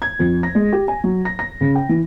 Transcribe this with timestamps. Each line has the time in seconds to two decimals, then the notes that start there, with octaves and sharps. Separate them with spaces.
0.02 G#6
0.19 F2
0.43 A#6
0.55 G#3
0.72 G4
0.88 G#5
1.04 F#3
1.25 A#6
1.39 A#6
1.61 C#3
1.75 G5
1.89 E3